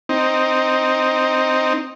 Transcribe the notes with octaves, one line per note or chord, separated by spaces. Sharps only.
C4 D#4